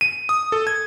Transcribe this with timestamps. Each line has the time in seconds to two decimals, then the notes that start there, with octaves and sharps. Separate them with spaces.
0.01 D#7
0.29 D#6
0.52 A4
0.67 G#6